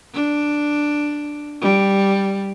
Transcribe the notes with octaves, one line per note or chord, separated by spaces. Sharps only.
D4
G3